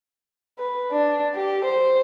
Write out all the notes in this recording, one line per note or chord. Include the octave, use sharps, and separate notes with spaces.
B4
D4
G4
C5